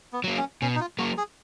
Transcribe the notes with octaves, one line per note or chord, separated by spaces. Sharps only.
B3
F#3 A#3
C#4
B2 C#4
D#4
F4
F#3 A#3 F#4
G#4